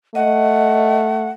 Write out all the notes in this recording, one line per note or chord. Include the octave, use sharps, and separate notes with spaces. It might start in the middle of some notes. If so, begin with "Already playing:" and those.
A3 D#5 F#5